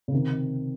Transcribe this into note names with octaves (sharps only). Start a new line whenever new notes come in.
C#3
C3 D#3